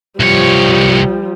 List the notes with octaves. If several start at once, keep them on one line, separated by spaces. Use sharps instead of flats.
C2 F3 G3 C#5